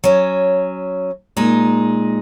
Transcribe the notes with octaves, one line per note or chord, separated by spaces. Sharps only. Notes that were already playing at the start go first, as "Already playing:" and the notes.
F#3 C#4
A#2 G#3 D#4